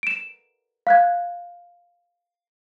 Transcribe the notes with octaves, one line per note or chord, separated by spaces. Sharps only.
D7 E7
F5 F#6 G#6